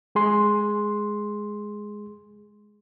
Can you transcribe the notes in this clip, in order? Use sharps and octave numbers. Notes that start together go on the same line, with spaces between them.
G#3 G#4 C6